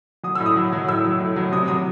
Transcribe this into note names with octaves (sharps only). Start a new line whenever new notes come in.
F#3 D#6
A2 E6
D#6
F#3
F#3
A2 E6
F#3
A2
F#3
C3 D#6
F#3 D#6